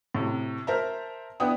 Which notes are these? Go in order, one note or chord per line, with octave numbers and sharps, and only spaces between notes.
A2 C3
A#4 C5 E5 A5 A#5
B3 D4 E4 F#5 G5 D#6